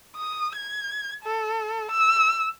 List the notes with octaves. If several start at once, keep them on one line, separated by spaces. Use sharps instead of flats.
D#6
G#6
A4
E6